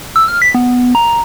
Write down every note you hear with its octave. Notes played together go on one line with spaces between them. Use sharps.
E6
F6
B6
B3
A#5